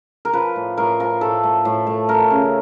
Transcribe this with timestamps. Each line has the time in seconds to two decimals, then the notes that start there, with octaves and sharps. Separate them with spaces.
0.25 A#4
0.33 F3 B4
0.56 A2
0.77 A2 A#4
1.00 F3 A#4
1.21 A2 A4
1.43 A3
1.65 A2
1.87 A3
2.08 A3 A#4
2.30 C#3